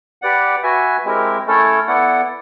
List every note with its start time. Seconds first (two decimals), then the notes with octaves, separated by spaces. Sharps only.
0.22 G4 B4 D5 F#5
0.63 F#4 B4 E5 G#5
1.05 G#3 C4 E4 G4 A#4
1.47 A3 C#4 E4 A4 C#5
1.87 B3 E4 A4 D5 F#5